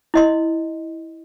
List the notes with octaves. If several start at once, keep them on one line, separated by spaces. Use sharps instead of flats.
E4 D#5 C6